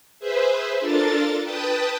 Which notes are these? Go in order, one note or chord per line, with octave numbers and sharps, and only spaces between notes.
G#4 B4 C5 E5
D4 F4 A4 A#4 A6
B4 G5 A5 D#6